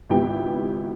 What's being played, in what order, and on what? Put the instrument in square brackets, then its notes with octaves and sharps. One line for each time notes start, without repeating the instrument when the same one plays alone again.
[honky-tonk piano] G#1 C#2 B3 E4 G4 G5